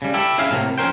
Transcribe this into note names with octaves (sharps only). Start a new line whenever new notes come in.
C#3 G3
E4 G4 A4
C#4 E4 G#4 E5 F5
A2 C3 A3 A#3
F2 C#4 A#4 C5 G5